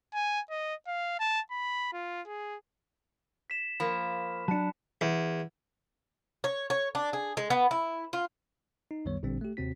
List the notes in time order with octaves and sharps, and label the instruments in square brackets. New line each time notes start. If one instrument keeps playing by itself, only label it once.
[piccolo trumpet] G#5
D#5
F5
A5
B5
F4
G#4
[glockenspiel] B6 E7
[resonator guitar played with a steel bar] F3 A#3 [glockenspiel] B5
[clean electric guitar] F#3 D4 [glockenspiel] A5 C#7
[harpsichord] E2
[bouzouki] C#5
C#5
D4
G#4
G#3
B3
E4
F4
[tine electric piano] D#4
C2 F#2 D#3 G3 B3 C#5
A1 A#2 D3 G3 C4 D4
A3 G4
D#2 C3 C4 F#4 B6